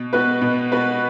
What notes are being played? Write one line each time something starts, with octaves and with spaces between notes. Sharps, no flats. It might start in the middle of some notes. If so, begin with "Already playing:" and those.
Already playing: B2
B3 F#4 B4
B2
B3 F#4 B4